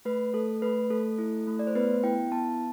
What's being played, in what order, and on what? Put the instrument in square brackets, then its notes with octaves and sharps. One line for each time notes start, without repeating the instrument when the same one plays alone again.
[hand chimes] A3 B4
A3 A4
A3 B4
A3 A4
E4
A3
D5
C5
B3 B4
E4 G5
B3 A5